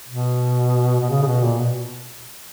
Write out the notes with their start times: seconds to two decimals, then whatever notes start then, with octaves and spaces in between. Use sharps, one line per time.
0.08 B2
1.00 B2
1.09 C#3
1.22 C#3
1.26 B2
1.43 A#2
1.60 B2